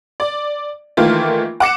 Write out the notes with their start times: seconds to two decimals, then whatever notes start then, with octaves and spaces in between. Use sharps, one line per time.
0.20 D5
0.97 D#3 E3 A3 A#3 F4
1.60 F#5 D6 C#7 E7